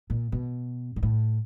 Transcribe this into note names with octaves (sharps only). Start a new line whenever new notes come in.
A#2
B2
A#2
A2